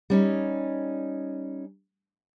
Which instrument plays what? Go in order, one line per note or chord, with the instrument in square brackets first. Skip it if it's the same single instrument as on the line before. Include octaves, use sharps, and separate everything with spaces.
[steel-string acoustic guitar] G3 C#4 D#4